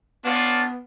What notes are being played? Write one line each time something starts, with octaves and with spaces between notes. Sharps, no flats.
B3 C#4 D4 F4